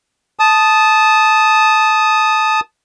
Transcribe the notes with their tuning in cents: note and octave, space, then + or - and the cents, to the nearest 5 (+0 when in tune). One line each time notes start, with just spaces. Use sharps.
A5 -15 D#6 +0